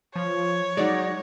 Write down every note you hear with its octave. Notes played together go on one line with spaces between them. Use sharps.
F3 C#5
F#3 G#3 D#4 D5